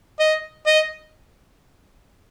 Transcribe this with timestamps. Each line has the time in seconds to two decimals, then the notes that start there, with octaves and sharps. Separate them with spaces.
0.20 D#5
0.66 D#5